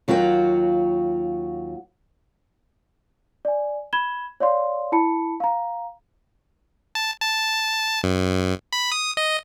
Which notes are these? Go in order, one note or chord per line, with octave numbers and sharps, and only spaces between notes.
D#2 F#3 F4 F#4 G5
D5 G#5
B5 G#6 E7 G7
C#5 D5 F5 C6
E4 A5 B5 C#7
F5 A#5
A5
A5
F#2
B5
D#6
D#5